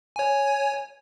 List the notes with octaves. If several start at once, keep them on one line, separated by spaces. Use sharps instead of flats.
C#5 G#5